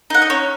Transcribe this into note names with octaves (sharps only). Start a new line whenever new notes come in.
D#4 F#5
D#5
C#4 C#5